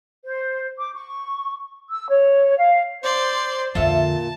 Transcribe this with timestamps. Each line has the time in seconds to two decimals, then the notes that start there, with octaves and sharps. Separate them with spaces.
0.24 C5
0.78 D6
0.94 C#6
1.89 E6
2.08 C#5
2.57 F5
3.03 C5 D5 C6
3.75 F2 A#2 D3 F4 A4 E5 A5